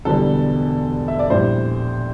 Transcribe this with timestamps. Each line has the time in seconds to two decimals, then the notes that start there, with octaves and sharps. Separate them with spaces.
0.05 E1 E2 D3 G3 A4
1.08 E5
1.19 D5
1.30 A#1 A2 G3 C5